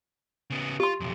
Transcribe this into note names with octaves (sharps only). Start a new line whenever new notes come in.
C#3 B3
F4 G4 C6
B1 F2